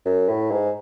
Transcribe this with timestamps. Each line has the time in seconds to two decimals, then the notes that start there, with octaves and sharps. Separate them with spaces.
0.05 F#2
0.29 A2
0.51 G#2